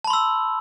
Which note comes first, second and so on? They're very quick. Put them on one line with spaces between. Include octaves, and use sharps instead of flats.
A5 B5 C6 E6